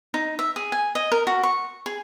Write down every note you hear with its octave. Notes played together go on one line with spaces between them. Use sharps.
D#4
E5
G#4
G#5
D#5
A#4
F#4
C#6
G#4